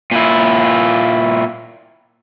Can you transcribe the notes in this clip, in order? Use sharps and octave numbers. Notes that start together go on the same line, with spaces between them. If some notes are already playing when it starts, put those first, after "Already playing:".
A#2 E4